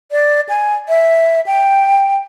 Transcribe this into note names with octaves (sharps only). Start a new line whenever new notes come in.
D5
G#5
E5
G5